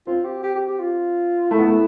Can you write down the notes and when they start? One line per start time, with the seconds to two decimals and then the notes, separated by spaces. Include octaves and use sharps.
0.07 C4 F4
0.25 G4
0.43 G4
0.55 G4
0.67 G4
0.80 F4
1.50 A3 E4
1.59 B3
1.68 A3